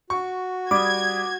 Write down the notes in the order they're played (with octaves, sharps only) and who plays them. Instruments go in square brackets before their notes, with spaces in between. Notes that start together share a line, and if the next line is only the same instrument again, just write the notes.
[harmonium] F#4 [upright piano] C#6
[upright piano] G3 [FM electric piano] D6 D#6 [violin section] G#6